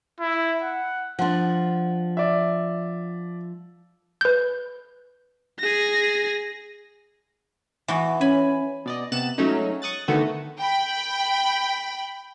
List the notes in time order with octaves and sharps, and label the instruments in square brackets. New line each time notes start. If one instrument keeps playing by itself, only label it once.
[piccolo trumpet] E4
F#5
[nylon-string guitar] F3 D4 [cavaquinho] F#5 C6
[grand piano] D5 E5
[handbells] B4 G6
[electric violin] G#4 A#6
[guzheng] E3 B3 F#4
[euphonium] C#4 [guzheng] G#5 B5
[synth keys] B2 D5 D#5
C3 B3 F#6 A6 E7
F#3 G#3 A3 C#4 D#4
C#6 D#6 F#6 A6
D3 D#3 A3 B3 F#4 A4
[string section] G5 B5